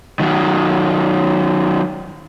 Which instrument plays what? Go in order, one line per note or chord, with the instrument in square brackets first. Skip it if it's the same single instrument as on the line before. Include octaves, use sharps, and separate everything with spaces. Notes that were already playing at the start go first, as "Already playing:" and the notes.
[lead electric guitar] D#3 F#3